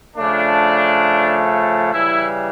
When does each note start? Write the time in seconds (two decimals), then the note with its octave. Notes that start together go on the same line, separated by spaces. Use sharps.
0.17 C#3 F3 A3 D4
1.92 C#3 E3 G3 E4